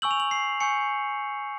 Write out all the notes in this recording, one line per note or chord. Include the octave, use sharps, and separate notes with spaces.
G#5 C#6 E6 G6 F#7
F7
F#7
C7
G#5 C#6 E6 G6 C#7